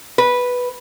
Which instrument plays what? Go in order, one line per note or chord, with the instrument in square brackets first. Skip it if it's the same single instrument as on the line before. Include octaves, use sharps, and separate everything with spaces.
[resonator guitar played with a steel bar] B4